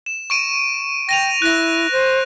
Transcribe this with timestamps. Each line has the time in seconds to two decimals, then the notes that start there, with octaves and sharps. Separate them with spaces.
0.06 E7
0.30 C#6 D7 D#7
1.09 G5 A#6 D#7 F7
1.42 E4 F#6 A#6
1.92 C5